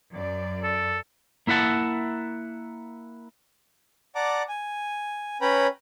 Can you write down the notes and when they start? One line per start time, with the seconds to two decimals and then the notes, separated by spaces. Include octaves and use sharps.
0.14 F#2 D5
0.63 A4
1.47 A#3 E4 E5 F#5 A5
4.15 D5 F#5 A5 A#5 D6
4.49 G#5
5.41 C#4 B4 C#5 G5 A#5 B5